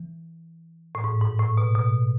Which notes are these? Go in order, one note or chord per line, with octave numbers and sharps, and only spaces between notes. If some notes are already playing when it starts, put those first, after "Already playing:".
Already playing: E3
A2
G#2
G#2
A2
B2
B2